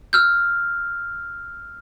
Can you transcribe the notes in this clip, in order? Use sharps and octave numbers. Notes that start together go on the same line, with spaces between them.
E6 F6 G6